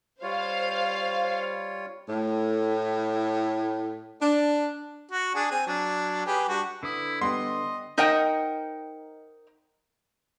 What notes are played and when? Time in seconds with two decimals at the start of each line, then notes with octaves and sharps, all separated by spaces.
0.22 G3 F4 C5 C#5 F5
2.08 A2
4.21 D4
5.11 F#4
5.35 D4 G#4
5.51 C4 G#5
5.67 F#3 D4
6.26 G4 G#4 B4
6.49 G3 D4 F#4
6.83 D3 E4 B4 D#6
7.21 G3 B3 D#5 C6
7.98 D#4 A#4 C5 D#5 F#5 G5